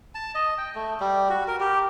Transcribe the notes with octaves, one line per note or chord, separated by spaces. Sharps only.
A5
D#5
G5
A3
G3
F#4
A#4
G4